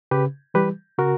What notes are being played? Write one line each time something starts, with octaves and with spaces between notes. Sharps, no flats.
C#3 G4 B4
E3 G3 G4 B4
C#3 F#4 A#4